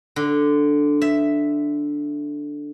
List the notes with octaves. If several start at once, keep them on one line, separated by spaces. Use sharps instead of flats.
D3
E5